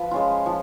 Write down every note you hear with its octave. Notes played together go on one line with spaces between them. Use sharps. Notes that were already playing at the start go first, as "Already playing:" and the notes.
Already playing: F3 B4
G#3 C#4 F4
F3